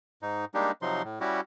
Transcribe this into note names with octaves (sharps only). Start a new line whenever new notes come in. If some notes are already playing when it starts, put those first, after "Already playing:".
G#2 D#4
G3 G#3 A#3 D4 D#4 G4
C3 F3 F#3 D#4 C6
A2
G3 C#4 E4 F#4 G4